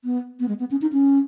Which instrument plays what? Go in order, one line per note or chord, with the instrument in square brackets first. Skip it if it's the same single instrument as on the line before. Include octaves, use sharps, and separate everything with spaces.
[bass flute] B3
B3
G#3
B3
C#4
D#4
C#4